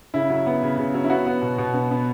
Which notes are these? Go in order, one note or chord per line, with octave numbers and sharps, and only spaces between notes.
C#3 E4
F#3
B3
C#3
C#3
F#3
E4
B3 F#4
B3
B2
B2
B3
B3